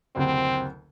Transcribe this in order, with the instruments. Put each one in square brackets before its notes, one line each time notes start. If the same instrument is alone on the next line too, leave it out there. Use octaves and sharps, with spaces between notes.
[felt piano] F#1 D2 C3 [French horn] C4